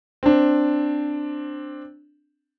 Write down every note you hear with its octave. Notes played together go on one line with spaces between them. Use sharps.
C4 D4